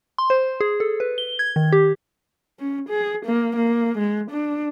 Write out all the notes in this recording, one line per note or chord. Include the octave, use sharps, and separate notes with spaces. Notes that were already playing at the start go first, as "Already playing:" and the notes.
C6
C5
G#4
A4
B4
G7
G#6
D#3
G4
C#4
G#4
A#3
A#3
G#3
D4